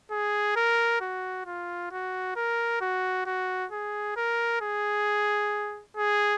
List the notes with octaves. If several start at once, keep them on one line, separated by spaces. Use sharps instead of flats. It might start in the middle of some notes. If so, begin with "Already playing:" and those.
G#4
A#4
F#4
F4
F#4
A#4
F#4
F#4
G#4
A#4
G#4
G#4